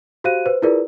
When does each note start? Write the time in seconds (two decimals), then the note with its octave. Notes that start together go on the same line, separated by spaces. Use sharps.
0.24 F#4 G4 C5 F5 F#6 D#7
0.46 B4 C5
0.62 E4 F4 G#4 A#4 B4 D5